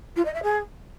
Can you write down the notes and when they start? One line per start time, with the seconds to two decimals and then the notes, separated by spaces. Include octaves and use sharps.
0.16 F4
0.25 D#5
0.34 E5
0.43 G#4